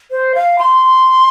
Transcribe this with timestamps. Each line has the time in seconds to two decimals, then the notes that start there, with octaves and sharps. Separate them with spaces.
0.11 C5
0.35 F5
0.59 C6